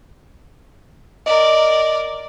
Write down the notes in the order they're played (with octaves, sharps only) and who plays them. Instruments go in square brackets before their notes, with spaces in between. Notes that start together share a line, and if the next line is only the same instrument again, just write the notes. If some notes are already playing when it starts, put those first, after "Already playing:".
[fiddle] A#4 D5 [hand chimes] D#5